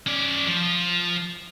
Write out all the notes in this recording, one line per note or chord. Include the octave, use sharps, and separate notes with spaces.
C#4 D5
F3